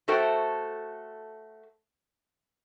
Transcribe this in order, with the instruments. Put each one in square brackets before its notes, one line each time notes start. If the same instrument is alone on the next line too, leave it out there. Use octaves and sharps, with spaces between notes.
[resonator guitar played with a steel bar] A3 F#4 A4 C5 G5